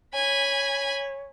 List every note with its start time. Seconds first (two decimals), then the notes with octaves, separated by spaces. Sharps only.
0.14 C#5 G#5 B5